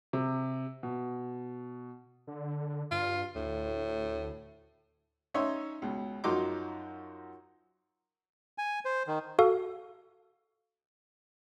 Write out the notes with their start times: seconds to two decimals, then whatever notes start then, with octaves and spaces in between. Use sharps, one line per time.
0.13 C3
0.83 B2
2.27 D3
2.91 G2 F4
3.35 D2 A2
5.34 C#4 D#4 C#5 E5 C6
5.82 C#2 B2
6.24 F#2 F3 D#4 F#4 C6 D6
8.58 G#5
8.85 C5
9.07 D#3
9.39 F#4 A4 F5